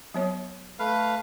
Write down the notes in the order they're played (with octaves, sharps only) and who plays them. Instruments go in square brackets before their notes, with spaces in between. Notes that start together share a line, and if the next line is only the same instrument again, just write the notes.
[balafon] F#3 B3 C#5
[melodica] A3 B4 F5